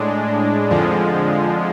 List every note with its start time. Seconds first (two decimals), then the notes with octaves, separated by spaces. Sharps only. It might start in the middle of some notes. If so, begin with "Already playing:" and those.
Already playing: A2 G#3 D4
0.70 F2 D3 F3 G#3